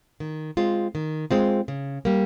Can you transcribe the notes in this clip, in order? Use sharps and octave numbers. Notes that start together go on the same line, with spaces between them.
D#3
G#3 C4 F4
D#3
G#3 C4 F4
C#3
G3 A#3